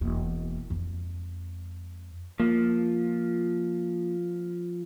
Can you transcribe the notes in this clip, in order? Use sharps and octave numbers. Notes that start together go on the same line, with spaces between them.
E1 A#3
F2 G#3
F3 A#3